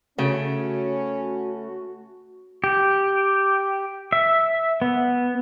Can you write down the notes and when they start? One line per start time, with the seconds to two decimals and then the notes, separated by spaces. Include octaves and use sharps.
0.18 C#3 A3 C#4 F#4
2.64 G4
4.12 E5
4.82 B3